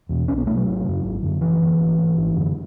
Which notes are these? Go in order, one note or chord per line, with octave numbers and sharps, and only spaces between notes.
E2 B2
B1 C#4
B3
B2 A3
F#3
G#1
F#2 C#3
G#1
F#2 D3
G#1 E3
F#2 D3
G#1
G#2
G#1
F#2 D3